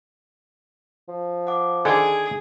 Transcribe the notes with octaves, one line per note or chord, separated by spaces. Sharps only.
F3
F#5 D6
D3 D#3 G#4 A4 G#5 G#6 D7